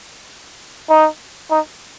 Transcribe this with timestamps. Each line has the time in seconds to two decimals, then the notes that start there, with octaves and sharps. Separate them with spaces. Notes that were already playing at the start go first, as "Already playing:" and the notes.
0.89 D#4
1.50 D#4